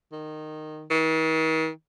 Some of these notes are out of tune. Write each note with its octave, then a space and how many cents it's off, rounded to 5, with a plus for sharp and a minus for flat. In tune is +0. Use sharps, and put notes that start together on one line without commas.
D#3 -15
D#3 +45